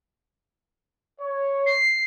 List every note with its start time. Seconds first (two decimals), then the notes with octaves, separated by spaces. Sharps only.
1.21 C#5
1.66 C7